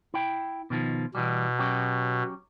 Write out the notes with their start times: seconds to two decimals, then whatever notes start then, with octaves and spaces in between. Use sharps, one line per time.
0.14 E4 G5
0.70 B2 D#3 F3
1.15 B2 E3 G3
1.59 F#3 C#4 G4